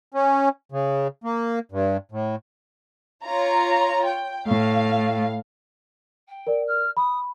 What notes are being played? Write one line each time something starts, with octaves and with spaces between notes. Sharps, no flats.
C#4
C#3
A#3
G2
A2
F4 C#5 A#5
G5
A2 F5
G5
A#4 D5
F6
B5 D#6